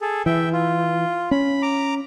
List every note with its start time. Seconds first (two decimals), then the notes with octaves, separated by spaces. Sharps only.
0.01 G#4 A4
0.26 E3 E5 G5
0.53 F4
1.31 C#4 B5
1.62 A#5 D6